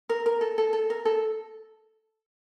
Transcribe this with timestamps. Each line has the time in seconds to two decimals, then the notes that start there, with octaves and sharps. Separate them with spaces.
0.09 A#4
0.26 A#4
0.41 A4
0.58 A4
0.73 A4
0.90 A#4
1.05 A4